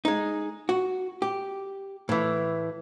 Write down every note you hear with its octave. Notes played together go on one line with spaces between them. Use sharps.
G#3 D#4
F#4
G4
A2 E3